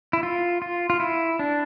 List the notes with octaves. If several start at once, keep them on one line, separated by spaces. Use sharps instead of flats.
E4
F4
F4
F4
E4
D4